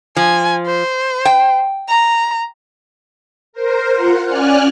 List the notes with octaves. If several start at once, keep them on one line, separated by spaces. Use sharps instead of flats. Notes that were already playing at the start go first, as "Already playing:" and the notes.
F3 G#5
C5
G5
A#5
A#4 C5
F4 F#5
C#4 D5 G#5 F6 F#6